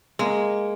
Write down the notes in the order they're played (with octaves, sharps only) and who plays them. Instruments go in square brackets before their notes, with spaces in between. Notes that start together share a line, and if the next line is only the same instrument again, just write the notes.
[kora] G#3 [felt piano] A#3